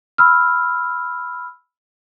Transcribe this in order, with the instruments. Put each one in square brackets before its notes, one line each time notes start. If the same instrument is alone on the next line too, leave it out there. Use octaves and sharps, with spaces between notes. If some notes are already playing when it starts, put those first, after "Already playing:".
[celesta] B5 E6 F6